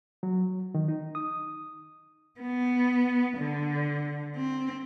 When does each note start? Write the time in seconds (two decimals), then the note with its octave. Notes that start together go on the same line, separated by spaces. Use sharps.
0.23 F#3
0.75 D#3
0.88 D#4
1.15 D#6
2.40 B3
3.38 D3
4.35 C4